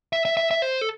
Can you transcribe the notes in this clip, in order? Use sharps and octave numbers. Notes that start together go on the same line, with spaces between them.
E5
E5
E5
E5
C5
A4